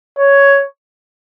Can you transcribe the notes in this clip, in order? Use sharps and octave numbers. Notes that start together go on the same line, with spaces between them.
C#5